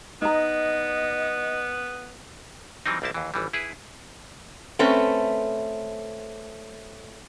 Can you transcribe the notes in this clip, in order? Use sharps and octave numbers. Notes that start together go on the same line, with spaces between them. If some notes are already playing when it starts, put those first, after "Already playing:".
B3 D#4 D#5 A#5
E3 F#3 G3 C4 D#4
B1 G3 C4 E4 A5
D#2 E3
G#1 E3 G3
E4 G#4 B4
A3 C4 C#4 B4